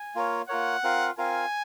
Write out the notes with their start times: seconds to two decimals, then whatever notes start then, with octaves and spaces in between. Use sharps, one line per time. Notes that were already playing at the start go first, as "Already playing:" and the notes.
Already playing: G#5
0.15 A#3 F4 A#4 C#5
0.48 A#3 F4 A#4 C#5 F#5
0.83 C4 F4 A#4 F5
1.18 C4 F4 A#4 F5 G#5